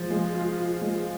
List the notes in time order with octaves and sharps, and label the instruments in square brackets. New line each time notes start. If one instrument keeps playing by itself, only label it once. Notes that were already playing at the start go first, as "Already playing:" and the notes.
Already playing: [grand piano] F3 [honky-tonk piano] G#3 F4
[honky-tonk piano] G#3
F4
F4
G#3